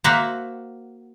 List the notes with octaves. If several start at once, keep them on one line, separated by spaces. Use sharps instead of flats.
A#3 F#4 C5 E5 F#5